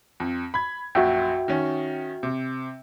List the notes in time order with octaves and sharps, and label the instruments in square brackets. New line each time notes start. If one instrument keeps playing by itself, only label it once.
[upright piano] F2
B5 G#6
[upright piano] A#1 F#2 [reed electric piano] F#4 E5 G5
[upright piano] D#3 C#4
C3